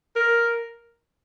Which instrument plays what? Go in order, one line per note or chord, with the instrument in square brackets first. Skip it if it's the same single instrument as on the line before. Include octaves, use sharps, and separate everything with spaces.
[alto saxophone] A#4